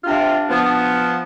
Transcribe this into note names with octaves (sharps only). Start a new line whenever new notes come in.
C3 D4 F4
F3 B3